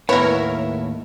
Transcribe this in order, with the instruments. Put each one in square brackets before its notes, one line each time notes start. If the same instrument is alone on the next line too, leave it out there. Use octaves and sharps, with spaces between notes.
[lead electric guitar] D#2 A2 [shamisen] B3 [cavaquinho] E4 [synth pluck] A#4 C#5